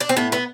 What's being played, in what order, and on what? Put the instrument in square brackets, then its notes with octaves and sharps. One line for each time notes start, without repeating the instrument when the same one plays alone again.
[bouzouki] D4
C4
A2 B3
B3